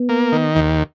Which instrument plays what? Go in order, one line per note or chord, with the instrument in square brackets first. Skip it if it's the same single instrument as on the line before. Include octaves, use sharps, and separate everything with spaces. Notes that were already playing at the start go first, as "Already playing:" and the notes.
Already playing: [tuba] B3
[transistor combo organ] A#3
D#3
D#2